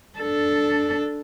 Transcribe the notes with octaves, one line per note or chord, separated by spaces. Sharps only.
D4 A4